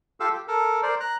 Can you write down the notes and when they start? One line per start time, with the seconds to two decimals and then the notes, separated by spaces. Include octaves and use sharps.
0.20 F4 G4 A4 F5 E6
0.33 G4
0.48 A4 A#4
0.83 A#4 C5 D5
1.00 A#5 F#6